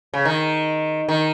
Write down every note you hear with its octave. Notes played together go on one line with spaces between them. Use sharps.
C#3
D#3
D#3